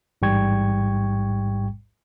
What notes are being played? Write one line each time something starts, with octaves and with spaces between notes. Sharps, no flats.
A1 G#2 G3 G5 C#6 G#6